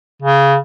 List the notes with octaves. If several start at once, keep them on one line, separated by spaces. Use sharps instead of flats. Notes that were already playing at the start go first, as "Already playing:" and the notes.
C#3